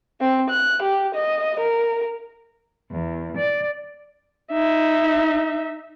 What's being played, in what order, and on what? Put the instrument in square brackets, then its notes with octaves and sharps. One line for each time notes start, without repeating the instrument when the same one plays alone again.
[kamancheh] C4
F#6
G4
D#5
A#4
[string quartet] E2
D5
[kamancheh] D#4 E5